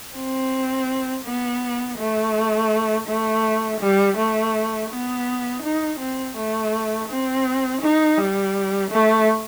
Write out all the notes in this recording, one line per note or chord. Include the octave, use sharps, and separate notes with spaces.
C4
B3
A3
A3
G3
A3
B3
D#4
C4
A3
C4
D#4
G3
A3